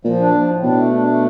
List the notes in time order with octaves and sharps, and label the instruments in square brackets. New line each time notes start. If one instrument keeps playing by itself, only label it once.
[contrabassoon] A#2 [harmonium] F3
[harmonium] D4
F3
A2
[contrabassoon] B2 [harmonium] D4
[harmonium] A3
D4
A3